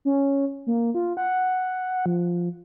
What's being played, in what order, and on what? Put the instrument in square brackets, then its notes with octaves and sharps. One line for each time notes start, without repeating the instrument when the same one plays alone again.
[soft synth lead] C#4
A#3
F4
F#5
F3